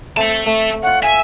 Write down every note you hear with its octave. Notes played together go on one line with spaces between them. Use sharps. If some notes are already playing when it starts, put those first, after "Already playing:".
A3 C4 E5 A5
A3
F4 C#5 F#5
E5 G#5